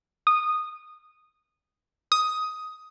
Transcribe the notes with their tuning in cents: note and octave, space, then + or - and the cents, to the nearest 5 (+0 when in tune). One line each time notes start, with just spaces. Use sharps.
D#6 -10
D#6 +10